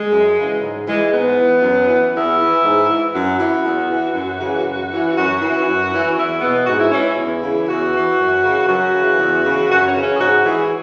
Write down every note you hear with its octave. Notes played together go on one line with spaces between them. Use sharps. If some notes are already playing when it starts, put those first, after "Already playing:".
Already playing: G#3
F#2
C#3 E3
G#2
E3 G#3
G#2 B3
E3
F#2
E3
E2 E4
E3
G#2
E3
F#2 F#4
E3
E2
E3
F#2
C#3 E3
F#2
E3
F#2 F#4
E3
F#2
E3
E2 E4
B2 B3
G#2 F#4
E4
E3 C#4
E4
E2
C#3 E3
E2 F#4
E3
F#2
C#3 E3
F#2 F#4
C#3 E3
E2
C#3 E3
F#2 F#4
C#4
C#3 E3
C#4
G#4
G#2 F#4
E3 G#4